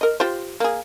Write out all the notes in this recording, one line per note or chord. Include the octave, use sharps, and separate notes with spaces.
A#4 D#5
F4 G4 C5
A#3 G#4